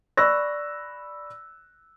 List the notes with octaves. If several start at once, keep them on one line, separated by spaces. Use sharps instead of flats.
D5 B5 C#6 E6 F#6 A#6